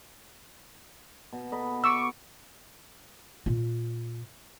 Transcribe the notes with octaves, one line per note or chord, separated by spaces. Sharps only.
B2
A4 B4 D#5
C#6 D6 E6
A#2 F4